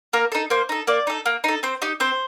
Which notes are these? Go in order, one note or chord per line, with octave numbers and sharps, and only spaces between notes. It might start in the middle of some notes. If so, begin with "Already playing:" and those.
A#3 A#4
D#4 A4
A#3 C5
D#4 A4
A#3 D5
D#4 A4
A#3
D#4 A4
C4 C5
D#4 G4
C4 C5